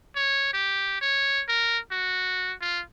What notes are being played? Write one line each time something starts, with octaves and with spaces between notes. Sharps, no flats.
C#5
G4
C#5
A#4
F#4
F4